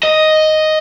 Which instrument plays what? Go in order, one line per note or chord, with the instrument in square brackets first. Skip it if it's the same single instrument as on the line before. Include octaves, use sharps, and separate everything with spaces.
[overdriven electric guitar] D#5